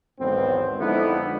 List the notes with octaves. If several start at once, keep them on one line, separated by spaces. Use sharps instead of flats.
B1 E2 G#2 D#3 B3 C4
F2 D3 G#3 B3 D#4 E4